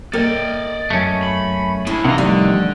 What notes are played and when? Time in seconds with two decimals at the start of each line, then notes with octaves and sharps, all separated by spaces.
0.13 A#3 A4 A#4 D5 D#5 G5
0.90 F#2 A3 C#4
1.23 B5
1.87 D4 E4 G#4 G#5
2.05 C2 C3 D#3 E3 D#5 F5 F#5
2.18 D3 F3 G3 A3